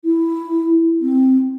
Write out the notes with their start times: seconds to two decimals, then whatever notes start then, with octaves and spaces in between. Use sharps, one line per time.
0.05 E4
1.02 C4